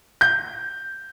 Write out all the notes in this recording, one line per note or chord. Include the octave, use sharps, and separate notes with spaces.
G6